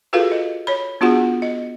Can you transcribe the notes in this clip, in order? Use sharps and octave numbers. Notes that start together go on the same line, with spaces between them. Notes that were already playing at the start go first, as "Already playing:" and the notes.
F4 F#4 G#4 A4 B4 F5
D#5
C#5 B5
B3 D4 F4 F#4 G#4 F#5
D#5